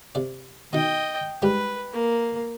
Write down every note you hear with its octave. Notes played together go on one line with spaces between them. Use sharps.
C3 D5
B2 D#3 D#4 D#5 G5
G#2 G3 G4 B4
A#3